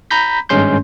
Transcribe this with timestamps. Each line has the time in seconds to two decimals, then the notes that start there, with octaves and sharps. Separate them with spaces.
0.11 A#5 B5 G6 B6
0.49 G#1 G2 G#3 C#4 C6 G6